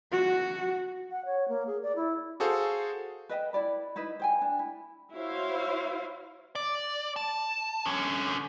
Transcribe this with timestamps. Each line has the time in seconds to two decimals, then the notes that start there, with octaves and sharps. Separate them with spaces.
0.12 F#4
1.11 F#5
1.25 C#5
1.48 A#3
1.67 G#4
1.83 D5
1.96 E4
2.40 F#4 G#4 A4 C5 F5
3.29 B4 D#5 E5 G5
3.53 E4 A4 D5 B5
3.96 D#4 E4 B4 D#5
4.20 C5 G5 G#5
4.41 D4
4.59 E4
5.14 E4 F#4 C5 C#5 E5 F5
6.55 D5
7.16 A5
7.86 D3 C#4